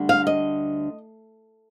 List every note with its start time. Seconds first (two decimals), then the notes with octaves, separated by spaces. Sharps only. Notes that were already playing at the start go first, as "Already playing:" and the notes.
Already playing: D2 D3 G3
0.09 F5
0.27 D#5